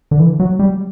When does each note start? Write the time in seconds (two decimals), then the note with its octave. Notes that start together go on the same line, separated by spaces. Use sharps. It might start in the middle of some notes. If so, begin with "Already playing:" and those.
0.11 D3
0.20 E3
0.40 F#3
0.59 G3